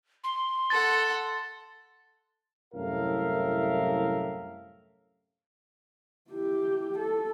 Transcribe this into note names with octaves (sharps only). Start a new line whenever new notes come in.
C6
A4 F#5 A6
C2 F#2 A2 A#4 E5 F5
E4 G4
A4